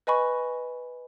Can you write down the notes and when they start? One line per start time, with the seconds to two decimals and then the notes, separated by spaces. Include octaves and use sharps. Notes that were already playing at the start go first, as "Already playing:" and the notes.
0.07 B4 D#5 G#5 B5 C#6